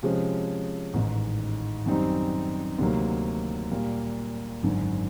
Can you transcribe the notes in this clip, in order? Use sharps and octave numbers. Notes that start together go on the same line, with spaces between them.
C3 F3 G#3 C#4
A1 G#2 D#3
F#2 D#3 G3 C4 D#4
D2 C3 D#3 F#3 A#3
A#2 G3 A#3
G#1 F#2 D3